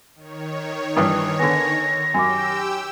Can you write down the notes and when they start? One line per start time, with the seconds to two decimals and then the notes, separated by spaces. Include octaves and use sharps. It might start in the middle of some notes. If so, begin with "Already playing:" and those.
0.15 D#3 C#5
0.96 G2 E3 D#6
1.39 D3 B3 G#5 A#6
2.14 F#2 G4 G5 G#5 D6 E6